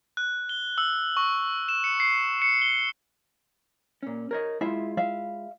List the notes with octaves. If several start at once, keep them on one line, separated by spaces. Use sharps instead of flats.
F#6
G7
E6
C#6
E7
C#7
C7
C#7
G7
A#2 C#4
A#4 C#5 D#5
G#3 E4 F4 E5
E5 F5